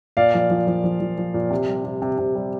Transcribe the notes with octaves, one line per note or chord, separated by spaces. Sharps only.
A#2 D5 F5
F3
F3
F3
F3
F3
F3
A#2
C3
G3
C3
C3
C3
G3